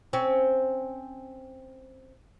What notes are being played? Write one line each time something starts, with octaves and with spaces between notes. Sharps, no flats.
C4 C#4